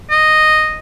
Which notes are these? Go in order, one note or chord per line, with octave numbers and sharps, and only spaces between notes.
D#5